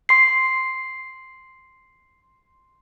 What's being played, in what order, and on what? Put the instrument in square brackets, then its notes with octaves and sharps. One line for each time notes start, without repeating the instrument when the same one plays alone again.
[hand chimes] C6 C7